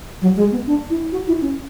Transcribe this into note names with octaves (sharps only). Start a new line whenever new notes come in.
F#3
G#3
B3
D4
E4
F#4
E4
C#4